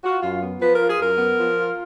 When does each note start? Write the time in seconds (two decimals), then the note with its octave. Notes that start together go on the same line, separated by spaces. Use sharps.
0.04 F4 F#4
0.23 F#2 F4
0.42 B3
0.60 F3 B4
0.74 A#4
0.80 F4
0.89 G#4
0.99 F#2 A#4
1.18 B3
1.37 F3
1.57 F4